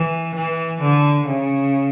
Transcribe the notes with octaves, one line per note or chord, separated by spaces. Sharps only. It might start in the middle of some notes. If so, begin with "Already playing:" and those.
Already playing: E3
E3
D3
C#3